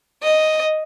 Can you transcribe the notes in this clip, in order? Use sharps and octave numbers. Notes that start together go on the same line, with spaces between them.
D#5